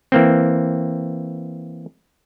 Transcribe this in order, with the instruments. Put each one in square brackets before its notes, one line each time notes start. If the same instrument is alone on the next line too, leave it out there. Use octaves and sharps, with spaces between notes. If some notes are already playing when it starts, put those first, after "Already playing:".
[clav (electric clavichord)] E3 A#3 C4